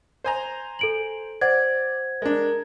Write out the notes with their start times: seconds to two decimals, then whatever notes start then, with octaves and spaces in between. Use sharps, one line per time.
0.24 C5 G#5 A#5
0.79 A4 D7 F#7
1.41 C5 D5 F#5 G#6
2.22 G#3 D4 A#4